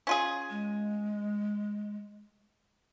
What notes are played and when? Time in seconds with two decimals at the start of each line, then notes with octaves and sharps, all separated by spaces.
0.07 C#4 F4 G#4
0.50 G#3